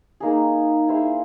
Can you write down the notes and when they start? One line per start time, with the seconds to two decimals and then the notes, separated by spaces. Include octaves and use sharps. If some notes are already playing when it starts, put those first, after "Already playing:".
0.20 A#3 D#4 G#4
0.88 E4 G#4 C5 F5